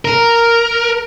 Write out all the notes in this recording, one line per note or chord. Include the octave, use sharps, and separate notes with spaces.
A#4